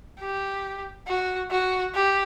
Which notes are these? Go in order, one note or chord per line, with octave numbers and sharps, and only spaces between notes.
G4
F#4
F#4
G4